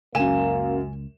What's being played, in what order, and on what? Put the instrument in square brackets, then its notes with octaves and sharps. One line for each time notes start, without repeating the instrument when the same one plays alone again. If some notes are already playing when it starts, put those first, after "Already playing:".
[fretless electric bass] C#2 [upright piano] F#2 E7 [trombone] A#3 [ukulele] G#5